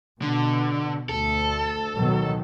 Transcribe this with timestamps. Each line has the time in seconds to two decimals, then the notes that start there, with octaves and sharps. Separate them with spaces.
0.22 B2 D3
1.09 D2 A4
1.95 B2 D#3 F#3